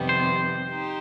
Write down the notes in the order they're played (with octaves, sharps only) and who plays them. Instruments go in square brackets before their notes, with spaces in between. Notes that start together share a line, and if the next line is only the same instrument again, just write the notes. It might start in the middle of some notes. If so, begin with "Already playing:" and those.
Already playing: [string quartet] F2 C3 D#3 G3 B3
[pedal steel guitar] C5
[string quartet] D#4 G4